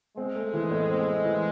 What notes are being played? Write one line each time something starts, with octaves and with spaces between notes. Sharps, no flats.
G#3 C4
A3
E3
A2
C4
A3
E3